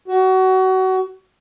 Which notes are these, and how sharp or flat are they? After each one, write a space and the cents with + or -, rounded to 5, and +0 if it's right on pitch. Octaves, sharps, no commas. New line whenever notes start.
F#4 +25